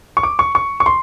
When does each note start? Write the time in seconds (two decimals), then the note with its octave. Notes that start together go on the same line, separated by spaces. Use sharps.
0.17 C#6
0.23 D6
0.39 C#6
0.55 C#6
0.80 C#6
0.86 C6